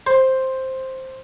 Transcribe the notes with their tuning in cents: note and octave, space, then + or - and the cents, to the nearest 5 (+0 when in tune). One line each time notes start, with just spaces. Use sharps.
C5 +5